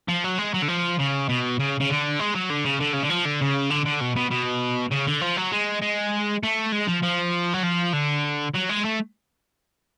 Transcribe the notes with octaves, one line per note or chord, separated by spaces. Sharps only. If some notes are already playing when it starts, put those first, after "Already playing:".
F3
F#3
G#3
F#3
D3
F3
C#3
B2
C#3
C#3
D3
G#3
F#3
D3
C#3
D3
C#3
D3
F3
D3
C#3
D3
D3
B2
B2
B2
C#3
D3
F3
F#3
G#3
G#3
A3
G#3
F3
F3
F#3
F3
D3
F#3
G#3
A3